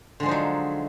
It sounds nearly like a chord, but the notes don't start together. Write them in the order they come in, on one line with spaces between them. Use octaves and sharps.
D3 G#3 F3 D#4 F#3